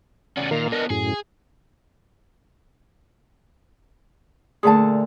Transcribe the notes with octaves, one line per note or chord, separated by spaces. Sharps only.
E2 C#3 C#4 D5 F#5 G#5
A#2 D#3 F5 A#5
B3 D4 A#4 D#5
F#2 A2 G#4
A#2 D3 A3 G#4 A5